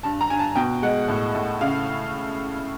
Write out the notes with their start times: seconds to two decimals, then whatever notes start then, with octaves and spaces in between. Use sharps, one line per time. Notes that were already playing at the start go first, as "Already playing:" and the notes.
0.03 G2 A5
0.21 A#5
0.30 G2 G#5
0.39 A5
0.55 B2 G5
0.83 G#3 F#5
1.08 A2
1.34 A2
1.61 C#3 F5